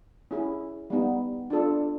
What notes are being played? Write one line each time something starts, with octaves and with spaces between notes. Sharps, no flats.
C#4 E4 G#4
G3 B3 D#4
D4 F4 A4